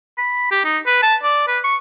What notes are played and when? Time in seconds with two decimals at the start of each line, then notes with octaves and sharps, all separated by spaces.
0.18 B5
0.51 G4
0.65 D#4
0.86 B4
1.03 A5
1.23 D5
1.48 B4
1.64 C#6